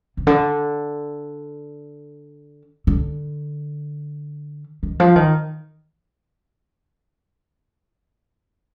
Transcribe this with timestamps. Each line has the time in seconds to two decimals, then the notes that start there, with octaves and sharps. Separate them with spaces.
0.17 C3
0.27 D3
2.87 D3
4.83 D#3
5.00 F3
5.16 D#3